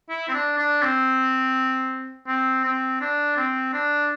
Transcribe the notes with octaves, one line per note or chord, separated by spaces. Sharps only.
E4
C4
D4
D4
C4
C4
C4
D4
C4
D4